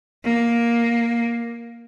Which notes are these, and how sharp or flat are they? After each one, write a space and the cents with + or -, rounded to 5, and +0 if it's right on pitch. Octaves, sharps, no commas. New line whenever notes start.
A#3 +5